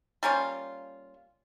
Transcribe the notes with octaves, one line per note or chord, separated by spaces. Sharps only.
G3 A#3 C#4 F4